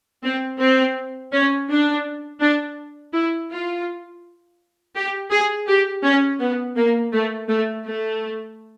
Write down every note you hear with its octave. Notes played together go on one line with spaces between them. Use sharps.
C4
C4
C#4
D4
D4
E4
F4
G4
G#4
G4
C#4
B3
A#3
A3
A3
A3